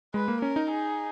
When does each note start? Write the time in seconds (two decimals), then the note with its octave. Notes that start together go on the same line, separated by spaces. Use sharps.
0.14 G#3 B4
0.28 A#3
0.42 C#4 A#4
0.56 D#4
0.71 G#4